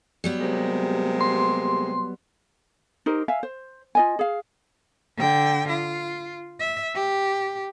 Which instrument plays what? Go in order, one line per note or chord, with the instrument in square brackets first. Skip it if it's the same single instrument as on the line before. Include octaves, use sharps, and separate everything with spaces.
[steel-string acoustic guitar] F#3 G3 B3
[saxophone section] C3 G#3 A#3
[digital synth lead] C6
[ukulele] D#4 G4 A#4 C5
E5 F5 G#5
C5
F4 D#5 G#5
G#4 F5
[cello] D3 G5
F4
E5
G4